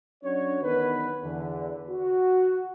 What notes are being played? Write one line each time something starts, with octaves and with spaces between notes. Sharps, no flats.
F#3 C#4 D4 F#4 C#5
E2 D#3 B3 B4
E2 D3
F#4